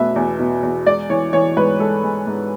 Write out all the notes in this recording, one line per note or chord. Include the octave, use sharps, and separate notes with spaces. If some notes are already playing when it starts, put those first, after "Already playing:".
Already playing: E2 B2 A3 B4 E5
E2
B2
E2
G#3 D5
E3 C#5
E3 C#5
G#2 B4
G#3 A4
G#3
G#2